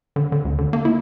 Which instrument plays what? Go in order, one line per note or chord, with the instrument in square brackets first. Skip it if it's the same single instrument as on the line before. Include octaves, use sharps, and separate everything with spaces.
[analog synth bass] D3
D3
D2
D3
A#3
E4